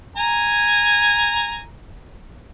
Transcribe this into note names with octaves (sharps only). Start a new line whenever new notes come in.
G#5 A#5